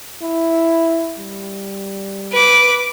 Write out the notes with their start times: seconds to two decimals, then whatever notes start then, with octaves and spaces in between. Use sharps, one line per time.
0.22 E4
1.17 G3
2.33 B4 D6